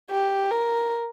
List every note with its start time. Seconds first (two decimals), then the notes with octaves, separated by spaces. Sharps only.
0.11 G4
0.51 A#4